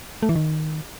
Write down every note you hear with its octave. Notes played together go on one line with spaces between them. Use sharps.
A3
E3
D#3